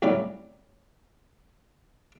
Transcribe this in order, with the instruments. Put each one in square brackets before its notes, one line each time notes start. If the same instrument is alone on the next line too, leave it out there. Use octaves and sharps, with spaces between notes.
[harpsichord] C2 A2 F#3 C#4 D5 B5